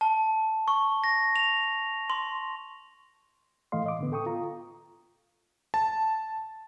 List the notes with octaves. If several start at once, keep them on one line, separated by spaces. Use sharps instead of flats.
A5
C#6
A#6
F7
C6
A2 E3 A3 D#5 F5 C6
D#5 D6
A2 D3 B3
A4 G5 C#6 D#6
F4 A#5
A5